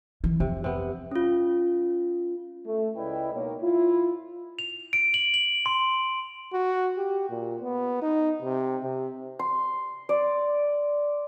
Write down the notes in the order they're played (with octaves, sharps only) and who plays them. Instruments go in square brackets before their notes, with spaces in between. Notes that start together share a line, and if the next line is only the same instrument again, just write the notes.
[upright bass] E3
[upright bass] F2 [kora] C3
[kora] C3 B3
[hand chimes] C#4 F4
[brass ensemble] A3
C#2 E4 B4 D5 D#5 G5
B2 A#3 D#4 A#4 C#5
E4 F4
[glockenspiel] F7
D7
F#7
F#7
C6
[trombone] F#4
G4
A#2
B3
D#4
C3
C3
[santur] C6
D5